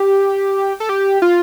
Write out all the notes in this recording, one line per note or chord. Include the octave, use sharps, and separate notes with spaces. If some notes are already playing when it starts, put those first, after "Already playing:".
Already playing: G4
A4
G4
F4